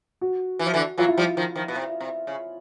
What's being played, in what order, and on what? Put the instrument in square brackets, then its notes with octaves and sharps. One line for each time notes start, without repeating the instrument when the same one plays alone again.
[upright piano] F#4
[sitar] E3
F3
D3 E3
[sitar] E3 F#3 [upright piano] F4
[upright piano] E4
[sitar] F3 G3 [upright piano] F4
[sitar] D#3 F3
D#3 F3
B2
C3
C3
C#3